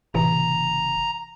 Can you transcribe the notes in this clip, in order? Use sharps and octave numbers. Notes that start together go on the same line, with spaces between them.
F#1 A2 C3 E3 A#5